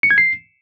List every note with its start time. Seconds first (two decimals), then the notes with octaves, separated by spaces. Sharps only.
0.03 C#7
0.11 G#6
0.18 C7